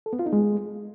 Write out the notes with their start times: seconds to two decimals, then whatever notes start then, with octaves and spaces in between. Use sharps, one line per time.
0.06 A4
0.13 B3
0.19 F4
0.26 D#4
0.33 G#3